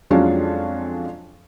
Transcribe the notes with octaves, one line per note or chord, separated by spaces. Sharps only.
F2 F#3 G#3 C#4 D4 F4